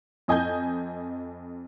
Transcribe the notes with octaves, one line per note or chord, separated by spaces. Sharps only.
F2 D#5 G#5 D#6 G6